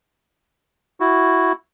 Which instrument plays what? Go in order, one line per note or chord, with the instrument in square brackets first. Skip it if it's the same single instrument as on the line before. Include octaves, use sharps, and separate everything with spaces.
[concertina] E4 F#4